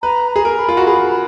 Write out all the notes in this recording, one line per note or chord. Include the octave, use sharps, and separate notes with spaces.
B4 A#5
G#4 A#5
A#4
B5
F4
F#4
G#4 B5
B5